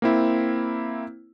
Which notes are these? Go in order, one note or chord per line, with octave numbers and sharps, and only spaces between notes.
A#3 C4 E4